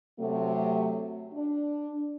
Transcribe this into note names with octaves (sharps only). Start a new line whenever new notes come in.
C3 F#3 A3
D4